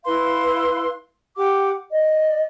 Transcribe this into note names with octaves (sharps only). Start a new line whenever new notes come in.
E4 B4 F5 C6
G4 F#5 D6
D5 D#5